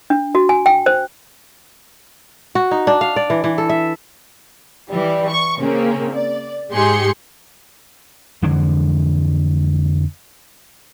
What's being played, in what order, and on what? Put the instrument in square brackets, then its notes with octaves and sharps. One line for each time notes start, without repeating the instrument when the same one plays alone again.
[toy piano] D4
F#4
G#5
G5
C5
[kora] F#4
D#4
D4
F5
D5
E3
E3
A4
E5
[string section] E3 G3
C#6
C#3 A#3 C4 C#4
D5
G#2 G#3 G4 G#4 C6 C#7
[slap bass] F2 D3 E3 G#3